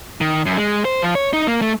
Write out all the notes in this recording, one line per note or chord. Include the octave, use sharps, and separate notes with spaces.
D#3
F#2
G#3
C5
F3
C#5
D#4
A#3
A3